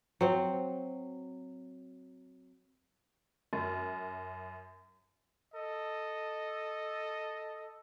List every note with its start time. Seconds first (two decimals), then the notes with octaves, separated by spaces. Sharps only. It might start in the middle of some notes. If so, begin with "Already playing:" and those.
0.21 F#3 C4
3.53 F#2
5.53 A4 D#5